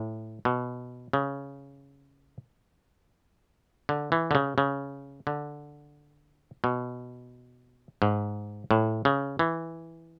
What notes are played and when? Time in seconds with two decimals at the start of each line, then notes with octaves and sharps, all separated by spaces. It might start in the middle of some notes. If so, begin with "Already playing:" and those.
Already playing: A2
0.45 B2
1.13 C#3
3.89 D3
4.12 E3
4.31 D3
4.35 C#3
4.58 C#3
5.27 D3
6.64 B2
8.02 G#2
8.71 A2
9.05 C#3
9.39 E3